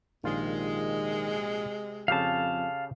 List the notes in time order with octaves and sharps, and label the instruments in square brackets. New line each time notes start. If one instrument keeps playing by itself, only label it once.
[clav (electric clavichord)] A#1 F4 [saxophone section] C3 G#3 [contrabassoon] D#3
[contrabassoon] F2 [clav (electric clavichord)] C#3 G4 A4 [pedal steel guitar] F5 A5